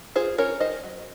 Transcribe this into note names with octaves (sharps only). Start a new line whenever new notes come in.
F4 G#4 C5
C#4 A#4 C#5
D#3 C5 D#5
F#3